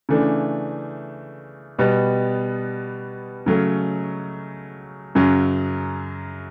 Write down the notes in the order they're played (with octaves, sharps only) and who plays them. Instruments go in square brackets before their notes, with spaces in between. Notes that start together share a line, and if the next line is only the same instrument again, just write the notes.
[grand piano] C#3 E3 A3 D4
B2 G3 B3
C#3 F#3 A3 C#4
F#2 C#3 F#3